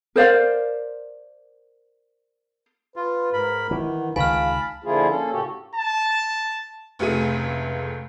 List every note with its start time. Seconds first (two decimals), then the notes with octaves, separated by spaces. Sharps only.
0.16 A#4 C5 D5 F5
2.96 F4 B4
3.33 G#2 A#4 B5
3.71 D#3 E3 F#5
4.16 C#2 D#3 F5 G#5 A5 B5 F6
4.84 D3 F3 A#3 E4 F4 G#4
5.08 A#3 C#4 A4
5.31 A2 C#3 F#4 G4 A4
5.75 A5
6.99 F1 C#2 A3 G#4 D#7